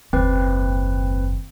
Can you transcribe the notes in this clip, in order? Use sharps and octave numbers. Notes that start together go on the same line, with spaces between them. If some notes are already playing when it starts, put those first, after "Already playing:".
F#1 D#2 C4 B4